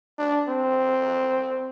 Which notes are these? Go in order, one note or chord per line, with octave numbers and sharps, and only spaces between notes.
D4
C4